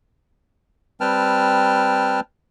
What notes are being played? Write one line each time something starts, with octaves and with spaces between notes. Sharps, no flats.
G3 C4 B4 G5 A5 F6